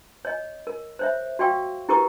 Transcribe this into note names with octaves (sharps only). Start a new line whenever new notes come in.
C#5 D#5
A#4
C5 C#5 E5
F#4 D5 F5 G5 C#6 E6
E4 G4 A#4 B4 C#6 D#6